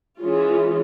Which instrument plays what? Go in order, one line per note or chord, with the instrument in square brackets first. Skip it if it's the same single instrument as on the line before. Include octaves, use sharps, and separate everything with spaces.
[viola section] E3 G#3 C#4 F4 G#4